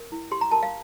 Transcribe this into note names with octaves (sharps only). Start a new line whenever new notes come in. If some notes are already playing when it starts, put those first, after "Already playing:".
Already playing: A#4
E4
G4 C6
A#5
A#4 A5
F5